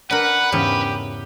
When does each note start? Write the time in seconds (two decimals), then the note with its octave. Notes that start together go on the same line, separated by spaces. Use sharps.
0.11 D4 A#4 B4 F#5
0.52 E2 G#2 C#3 G4